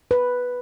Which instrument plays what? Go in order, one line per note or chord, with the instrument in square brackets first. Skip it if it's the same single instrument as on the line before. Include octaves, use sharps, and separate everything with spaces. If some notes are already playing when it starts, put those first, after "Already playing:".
[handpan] B4